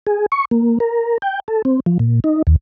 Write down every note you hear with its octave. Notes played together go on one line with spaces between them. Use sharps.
G#4
C#6
A#3
A#4
G5
A4
C4
F3
A#2
D#4
D#2